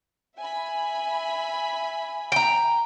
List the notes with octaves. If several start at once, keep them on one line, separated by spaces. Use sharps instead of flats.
E5 G#5 B5
G5 A#5